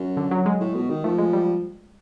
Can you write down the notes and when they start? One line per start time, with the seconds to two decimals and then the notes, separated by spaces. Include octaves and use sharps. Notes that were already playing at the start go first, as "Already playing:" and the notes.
Already playing: F#2
0.17 D3
0.31 F#3
0.46 G#3
0.60 A2
0.75 B2
0.90 D#3
1.04 F3 A3
1.18 G#3
1.33 G3